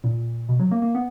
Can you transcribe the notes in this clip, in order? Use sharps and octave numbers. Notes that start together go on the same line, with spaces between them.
A#2
B2
F#3
A#3
A#3
B3